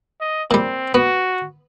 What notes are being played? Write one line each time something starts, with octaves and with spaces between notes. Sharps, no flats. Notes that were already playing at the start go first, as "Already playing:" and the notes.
D#5
A#2 G3 C4
B3 F#4